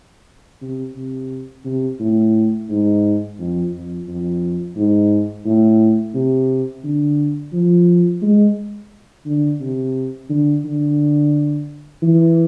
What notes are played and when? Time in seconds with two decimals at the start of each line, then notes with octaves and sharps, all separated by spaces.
0.62 C3
0.96 C3
1.65 C3
2.00 A2
2.69 G#2
3.39 F2
3.73 F2
4.08 F2
4.76 G#2
5.46 A2
6.14 C3
6.84 D3
7.53 F3
8.22 G#3
9.26 D3
9.60 C3
10.30 D3
10.65 D3
12.02 E3